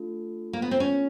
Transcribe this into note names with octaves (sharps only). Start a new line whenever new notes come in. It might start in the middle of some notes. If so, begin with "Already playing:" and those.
Already playing: A3 D4 F4 A4
A#3
B3
C4
C#4